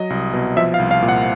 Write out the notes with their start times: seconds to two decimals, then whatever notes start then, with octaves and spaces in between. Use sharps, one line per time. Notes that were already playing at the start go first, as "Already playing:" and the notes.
Already playing: F#3 D#5
0.10 C2
0.33 B2
0.57 F3 E5
0.74 F5
0.79 C2
0.91 F5
1.02 A#2
1.09 F#5